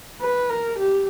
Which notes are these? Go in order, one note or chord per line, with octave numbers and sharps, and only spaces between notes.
B4
A#4
G4